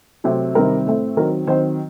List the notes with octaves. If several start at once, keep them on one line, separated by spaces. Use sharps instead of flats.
C3 F#3 A3 C4
C3 D#3 G3 C4 A#4
A2 A3 C4
D#3 F#3 C4 A#4
D#3 F#3 C4 C5